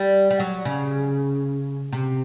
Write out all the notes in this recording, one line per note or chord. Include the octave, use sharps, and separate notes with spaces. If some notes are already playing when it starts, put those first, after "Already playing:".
Already playing: G3
G3
F#3
C#3
C3